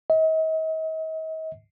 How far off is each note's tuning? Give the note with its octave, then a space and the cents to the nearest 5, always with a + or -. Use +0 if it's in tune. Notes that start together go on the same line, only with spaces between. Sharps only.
D#5 +40